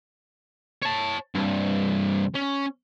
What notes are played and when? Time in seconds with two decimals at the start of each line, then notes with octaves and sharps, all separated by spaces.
0.83 C#5 A5
1.35 C2 G2
2.35 C#4